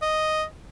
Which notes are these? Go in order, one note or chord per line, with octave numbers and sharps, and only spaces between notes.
D#5